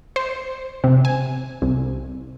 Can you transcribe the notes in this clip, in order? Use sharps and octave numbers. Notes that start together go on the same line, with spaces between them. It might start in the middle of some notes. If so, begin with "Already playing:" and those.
C5
C3
G#5
C2